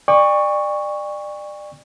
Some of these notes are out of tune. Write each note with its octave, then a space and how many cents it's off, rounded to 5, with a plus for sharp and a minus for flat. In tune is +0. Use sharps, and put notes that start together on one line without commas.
D5 +25 G5 +45 C#6 +0